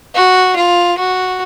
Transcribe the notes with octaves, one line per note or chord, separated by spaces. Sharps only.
F#4
F4
F#4